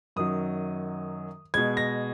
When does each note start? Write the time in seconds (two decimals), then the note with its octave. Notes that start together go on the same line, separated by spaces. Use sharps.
0.16 F#2 D#3 F#3 D#6
1.54 B2 G#3 G#6
1.77 A#6